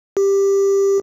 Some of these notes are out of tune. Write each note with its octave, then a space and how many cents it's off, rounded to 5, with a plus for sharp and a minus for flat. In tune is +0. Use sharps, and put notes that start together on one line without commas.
G4 +10